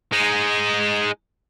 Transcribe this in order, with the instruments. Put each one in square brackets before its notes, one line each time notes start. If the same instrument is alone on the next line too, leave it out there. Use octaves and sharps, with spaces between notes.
[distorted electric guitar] G#3 D#4